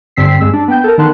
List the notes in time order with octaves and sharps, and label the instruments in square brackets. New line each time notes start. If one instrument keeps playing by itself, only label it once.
[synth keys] G2 D3 C4 E6 B6 C7
G2 G#3 E6
D4
B3 G5 G6
A4 A#4
D#3 B3 A5 C6 F#6